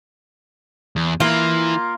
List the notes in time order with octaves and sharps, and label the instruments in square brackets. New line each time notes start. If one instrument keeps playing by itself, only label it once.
[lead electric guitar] E2
[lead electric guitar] E3 E4 [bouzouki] A#3 F4